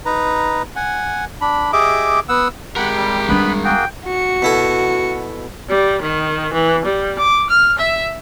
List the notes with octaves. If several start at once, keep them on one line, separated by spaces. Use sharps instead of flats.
D#4 B4 A#5
F#5 G#5
D4 B5
G4 G#4 D#5 E5 D6
B3 F#5 E6
G#3 G4 A#4 F#5 B5
G3
G3 B3 D4 B4 B5
A#3 F#4 G#4 G5
F#4 C#7
B2 E4 A4
G3
D#3
E3
G3
D6
F6
E5